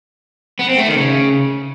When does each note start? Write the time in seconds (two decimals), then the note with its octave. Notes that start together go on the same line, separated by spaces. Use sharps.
0.59 B3
0.68 C4
0.78 A3
0.87 D#3
0.97 C#3